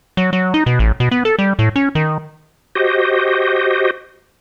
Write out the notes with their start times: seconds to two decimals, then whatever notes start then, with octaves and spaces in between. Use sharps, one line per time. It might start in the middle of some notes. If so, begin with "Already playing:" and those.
0.17 F#3
0.33 F#3
0.54 D#4
0.66 B2
0.79 A1
1.00 B2
1.11 B3
1.25 A4
1.39 G3
1.59 A2
1.76 C#4
1.95 D#3
2.75 F#4 G4 C5 D#5